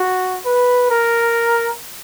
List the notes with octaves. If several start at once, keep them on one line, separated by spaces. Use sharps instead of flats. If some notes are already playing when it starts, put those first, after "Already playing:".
Already playing: F#4
B4
A#4